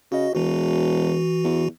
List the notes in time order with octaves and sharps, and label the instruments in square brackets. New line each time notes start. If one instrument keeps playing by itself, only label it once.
[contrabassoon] C#3 [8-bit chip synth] F#4 D#5
[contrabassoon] E1 [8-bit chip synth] E3 F#4
[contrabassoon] E2